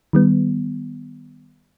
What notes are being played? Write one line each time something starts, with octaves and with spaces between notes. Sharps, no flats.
D#3 G3 B3